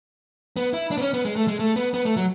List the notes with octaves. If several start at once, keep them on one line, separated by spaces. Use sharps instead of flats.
B3
E4
D4
B3
C#4
B3
G#3
A3
G#3
A3
B3
B3
A3
F#3